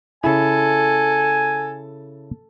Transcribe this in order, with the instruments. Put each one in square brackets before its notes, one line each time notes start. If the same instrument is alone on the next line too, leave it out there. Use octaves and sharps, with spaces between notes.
[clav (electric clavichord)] C#3 E4 [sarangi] A4 [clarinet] G#5